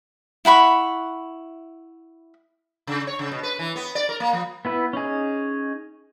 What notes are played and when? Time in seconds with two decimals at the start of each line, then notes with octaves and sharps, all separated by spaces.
0.45 E4 F#5 B5 C#6
2.87 C#3
3.07 C#5
3.19 C#3
3.32 B2
3.43 B4
3.59 E3
3.76 B3
3.95 D5
4.09 A#4
4.20 A#3
4.33 F3
4.65 B3 E4 B4
4.93 C#4 D#4 G#4